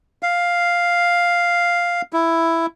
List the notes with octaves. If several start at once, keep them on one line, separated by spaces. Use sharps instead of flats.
F5
E4